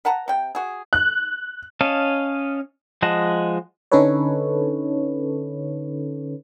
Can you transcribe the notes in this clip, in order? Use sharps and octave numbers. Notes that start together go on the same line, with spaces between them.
B4 F#5 A5 A#5
C3 G5
F#4 G#4
F#6
C#4 C#5 D#5 F5 A5
F3 G#3 D#5 F#5 A5
D3 C#4 D#4 A4 B4 C#5